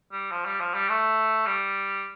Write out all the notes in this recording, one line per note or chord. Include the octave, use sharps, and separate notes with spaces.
G3
F3
G3
F3
G3
A3
G3